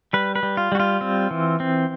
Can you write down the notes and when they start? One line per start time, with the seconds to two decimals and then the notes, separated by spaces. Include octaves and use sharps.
0.13 G3 B4
0.36 B4
0.43 G3
0.57 F4
0.72 G3 F#4
0.80 F4
1.01 C4
1.31 E3
1.60 C4